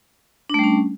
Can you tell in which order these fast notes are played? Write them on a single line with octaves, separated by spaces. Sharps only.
D4 A3 G3 C#4